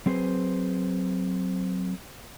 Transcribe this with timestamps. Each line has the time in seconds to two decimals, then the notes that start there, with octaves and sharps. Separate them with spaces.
0.06 F#3 C4 G#4 B4 C5